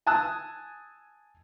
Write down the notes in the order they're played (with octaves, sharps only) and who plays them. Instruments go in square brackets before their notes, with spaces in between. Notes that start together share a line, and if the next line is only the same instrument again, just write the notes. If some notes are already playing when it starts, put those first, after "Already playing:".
[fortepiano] G#5 A5 D#6 E6 F#6